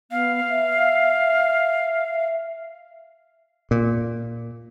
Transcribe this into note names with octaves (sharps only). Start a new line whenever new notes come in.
B3 F5
E5
A#2